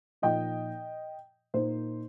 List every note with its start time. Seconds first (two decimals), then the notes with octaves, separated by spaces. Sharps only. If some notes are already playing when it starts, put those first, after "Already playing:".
0.22 A#2 F3 D#4 D#5 G5
1.54 A#2 A#3 D#4 C5